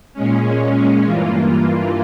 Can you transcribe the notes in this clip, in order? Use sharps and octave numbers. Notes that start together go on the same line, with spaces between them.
A#2 G#3 C#4
G2 E3 A#3 F4